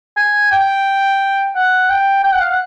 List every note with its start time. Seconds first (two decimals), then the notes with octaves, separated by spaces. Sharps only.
0.17 G#5
0.52 G5
1.56 F#5
1.90 G5
2.24 G5
2.32 F#5
2.41 F5
2.50 F#5